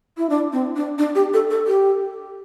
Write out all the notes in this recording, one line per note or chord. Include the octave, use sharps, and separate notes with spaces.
E4
D4
C4
D4
D4
G4
A4
A4
G4